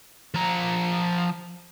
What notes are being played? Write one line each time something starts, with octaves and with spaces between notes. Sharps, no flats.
F3 A#5